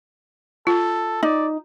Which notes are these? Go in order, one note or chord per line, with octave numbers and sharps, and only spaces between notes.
F4 A4
D#4 D5